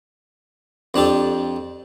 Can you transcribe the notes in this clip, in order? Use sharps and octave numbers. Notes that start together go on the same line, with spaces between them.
F2 D4 G4 A4